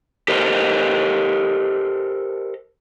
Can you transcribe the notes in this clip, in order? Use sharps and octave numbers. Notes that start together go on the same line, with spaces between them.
G4 A4 A#4 C5 D#5